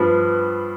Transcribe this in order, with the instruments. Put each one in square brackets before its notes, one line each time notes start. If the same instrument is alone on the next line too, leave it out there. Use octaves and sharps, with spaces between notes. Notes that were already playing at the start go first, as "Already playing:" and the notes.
Already playing: [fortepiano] G2 F3 B3